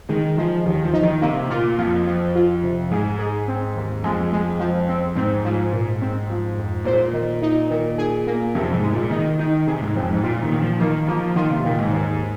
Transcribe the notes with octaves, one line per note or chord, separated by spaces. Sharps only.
D#3 G#3
F3 G#3
D#2 D#3
F3
D#4
D#3
C3 A#3
A#2 F4
F2 F4
F3
F4
C3
G#2 G#4
G#4
C4
D#2
F2 G#3
G#3
F3
C4
G#2 C4
G#2 F3
A#2
C4
F3
F2
A#2 C5
D#3
D#4
D#3
G#4
A#3
F2 C3
G#2
G#3
A#2
D#3 D#4
D#3 D#4
C3 G#4
G#2
F2 C4
G#2
A#2 F4
D#3
A#2
F3
D#3 A#3
F3 A#3
D#3 F4
C3
A#2 D#3
G#2
D#2